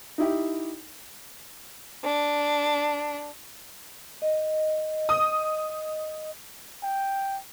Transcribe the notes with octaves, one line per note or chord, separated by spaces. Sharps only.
D#4 E4 G4
D4
D#5
D#6
G5